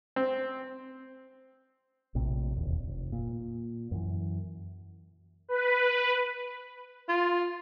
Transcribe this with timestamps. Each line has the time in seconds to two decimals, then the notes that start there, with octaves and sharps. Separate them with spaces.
0.16 C4
2.15 A#1 A2 C3
2.56 E1 D#2
2.88 F1
3.12 A#2
3.91 F#2 E3
5.49 B4
7.09 F4